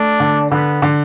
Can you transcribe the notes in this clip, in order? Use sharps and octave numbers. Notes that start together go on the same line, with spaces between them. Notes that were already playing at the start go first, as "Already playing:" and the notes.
Already playing: A3 D4
D3
D3 B3
D3